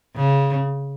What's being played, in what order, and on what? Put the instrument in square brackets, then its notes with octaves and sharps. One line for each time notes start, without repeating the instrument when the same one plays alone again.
[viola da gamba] C#3